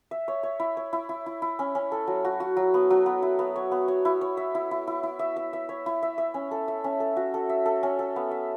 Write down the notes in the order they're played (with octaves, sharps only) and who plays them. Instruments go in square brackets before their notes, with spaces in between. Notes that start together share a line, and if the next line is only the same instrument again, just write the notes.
[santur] E5
C#5
C#5
E4
C#5
E4
E4
E4
E4
C#4
C#4
A4
F#3
F#4
F#4
F#3
B3
F#3
B3
E4
B3
C#5
B3
C#5
E4
C#5
E5
E4
E4
E4
E4
E5
E5
E5
C#5
E4
E5
E5
C#4
A4
E5
C#4
A4
F#4
A4
E5
A4
C#4
A4
B3
E5